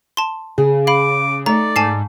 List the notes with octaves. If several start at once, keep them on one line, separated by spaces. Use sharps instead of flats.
A5 C6
C#3 G#4
F5 B5 D6
A3 D#4 D5 A#5
G#2 G#5 A5 C7